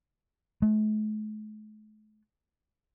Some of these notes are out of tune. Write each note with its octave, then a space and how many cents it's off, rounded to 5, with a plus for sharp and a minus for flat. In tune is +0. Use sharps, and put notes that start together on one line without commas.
A3 -45